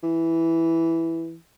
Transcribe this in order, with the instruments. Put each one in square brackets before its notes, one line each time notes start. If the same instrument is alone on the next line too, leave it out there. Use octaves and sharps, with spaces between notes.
[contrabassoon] E3